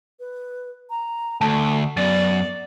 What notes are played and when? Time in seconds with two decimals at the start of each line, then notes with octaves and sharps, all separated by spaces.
0.20 B4
0.90 A#5
1.41 D2 A3 A5
1.97 F#2 B3 D5 A6